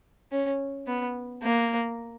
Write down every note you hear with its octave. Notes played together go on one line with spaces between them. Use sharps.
C#4
B3
A#3